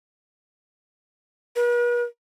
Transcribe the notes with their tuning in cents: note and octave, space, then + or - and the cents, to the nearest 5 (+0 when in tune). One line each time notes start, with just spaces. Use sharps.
B4 -45